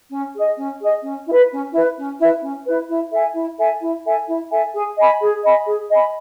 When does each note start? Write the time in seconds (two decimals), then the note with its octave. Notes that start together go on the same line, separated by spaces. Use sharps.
0.11 C#4
0.35 G#4 D#5
0.57 C#4
0.81 G#4 D#5
1.03 C#4
1.27 E4
1.32 B4
1.50 C#4
1.73 E4 B4
1.97 C#4
2.19 E4 B4
2.42 C#4
2.66 E4 B4
2.89 E4
3.13 A4 E5 G#5
3.35 E4
3.59 A4 E5 G#5
3.81 E4
4.05 A4 E5 G#5
4.27 E4
4.51 A4 E5 G#5
4.74 G#4
4.97 D#5 G#5 B5
5.21 G#4
5.43 D#5 G#5 B5
5.67 G#4
5.90 D#5 G#5 B5